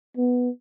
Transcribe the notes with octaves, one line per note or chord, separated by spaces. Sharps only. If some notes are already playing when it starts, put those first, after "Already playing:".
B3